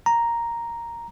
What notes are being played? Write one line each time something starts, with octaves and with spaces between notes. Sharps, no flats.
A#5